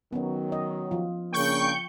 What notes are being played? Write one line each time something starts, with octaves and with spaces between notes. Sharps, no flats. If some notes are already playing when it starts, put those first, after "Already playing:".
D#3 F#3 B3 C#4
D#5
F3 F4
C#3 A#3 D4 G5 C#6 G6